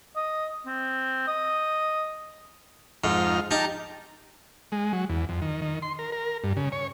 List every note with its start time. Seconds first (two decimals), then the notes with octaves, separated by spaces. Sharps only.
0.16 D#5
0.66 C4
1.27 D#5
3.04 F2 G#2 D#4 F6
3.51 D#4 G4 A5 A#5
4.72 G#3
4.93 F#3
5.09 E2
5.29 F2
5.42 D#3
5.62 D#3
5.82 C6
5.99 A#4
6.12 A#4
6.44 G2
6.57 C#3
6.72 C#5